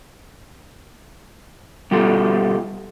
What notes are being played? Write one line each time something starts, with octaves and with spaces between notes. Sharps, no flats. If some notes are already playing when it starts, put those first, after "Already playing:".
B2 G3 F4 G4 A4